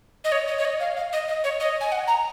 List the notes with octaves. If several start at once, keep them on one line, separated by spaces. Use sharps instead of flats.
D#5
C#5
D#5
C#5
D#5
F5
F5
D#5
D#5
C#5
D#5
G#5
F#5
A#5